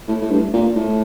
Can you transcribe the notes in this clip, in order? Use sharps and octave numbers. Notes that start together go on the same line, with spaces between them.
A2
A2
G2
A#2
A2